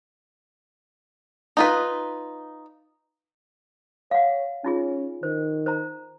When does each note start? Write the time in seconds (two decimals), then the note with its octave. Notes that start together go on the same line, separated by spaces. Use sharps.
1.57 D#4 F4 B4
4.11 C#5 F5 F#5
4.64 C#4 D#4 F4 G#4
5.23 D#3 C5
5.66 C5 A#5